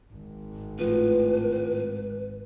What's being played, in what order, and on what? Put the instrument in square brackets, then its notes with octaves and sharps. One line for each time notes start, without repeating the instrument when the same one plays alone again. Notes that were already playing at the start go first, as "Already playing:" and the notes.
[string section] G#1
[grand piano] A2 F3 [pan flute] B4